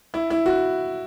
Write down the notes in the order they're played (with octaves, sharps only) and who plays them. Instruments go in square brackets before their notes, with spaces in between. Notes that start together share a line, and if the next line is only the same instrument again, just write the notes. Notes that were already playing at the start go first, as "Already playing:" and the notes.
[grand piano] E4
E4
F#4